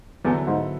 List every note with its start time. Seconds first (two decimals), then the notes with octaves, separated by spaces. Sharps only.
0.24 E2 D3 F#3 B3 E4 A4
0.47 G#2